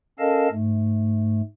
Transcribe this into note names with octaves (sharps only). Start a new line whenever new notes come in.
C#4 A4 A#4 D#5 F5 A5
G#2 A3